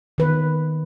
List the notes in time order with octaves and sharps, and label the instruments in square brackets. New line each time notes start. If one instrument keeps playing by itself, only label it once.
[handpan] D#3 B4